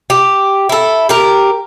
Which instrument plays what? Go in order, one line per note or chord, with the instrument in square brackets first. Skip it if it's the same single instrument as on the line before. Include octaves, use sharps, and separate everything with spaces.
[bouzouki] G4
E4 A4
G4 A#4